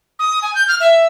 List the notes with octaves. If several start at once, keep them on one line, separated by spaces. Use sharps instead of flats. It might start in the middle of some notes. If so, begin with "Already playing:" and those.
D#6
G#5
G6
F6
E5